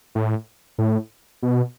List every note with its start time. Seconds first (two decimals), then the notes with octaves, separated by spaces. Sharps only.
0.15 A2
0.78 A2
1.42 B2